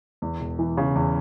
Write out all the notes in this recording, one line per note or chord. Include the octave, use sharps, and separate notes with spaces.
E2
E1
E3
C#3
E2